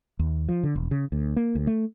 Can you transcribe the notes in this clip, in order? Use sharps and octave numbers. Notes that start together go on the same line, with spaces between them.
D#2
F3
D3
E1
C#3
D2
A#3
D2
A3